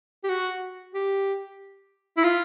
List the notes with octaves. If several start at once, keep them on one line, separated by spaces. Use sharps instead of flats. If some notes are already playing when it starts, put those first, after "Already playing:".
G4
F#4
G4
E4
F4